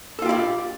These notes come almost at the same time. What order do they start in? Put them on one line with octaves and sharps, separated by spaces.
A4 F4 G4 E4 D5